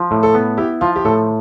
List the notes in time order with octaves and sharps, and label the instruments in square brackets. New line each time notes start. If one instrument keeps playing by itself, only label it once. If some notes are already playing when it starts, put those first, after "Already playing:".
Already playing: [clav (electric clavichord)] F3
A2
[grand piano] A4
[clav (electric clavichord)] B3
[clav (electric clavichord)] E4 [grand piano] G4
[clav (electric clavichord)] F3 [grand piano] F4
[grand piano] G4
[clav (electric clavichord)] A2 [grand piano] A4